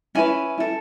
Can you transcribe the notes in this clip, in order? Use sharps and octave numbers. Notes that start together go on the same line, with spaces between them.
C#4 E4 B4 G#5
E4 A4